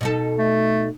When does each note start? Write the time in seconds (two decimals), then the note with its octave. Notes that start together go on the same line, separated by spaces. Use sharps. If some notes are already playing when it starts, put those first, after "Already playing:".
0.01 B2 D#4 A4
0.39 A3